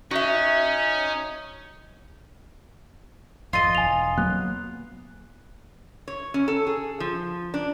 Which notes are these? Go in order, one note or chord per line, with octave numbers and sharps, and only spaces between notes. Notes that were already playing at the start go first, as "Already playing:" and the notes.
C#4 D#4 F#4 E5
G#1 F2 F4 D#5
E1 G#5 F7
F#3 A#3 B3 F#6
C#5
C#4
A4
G#4
F3
D4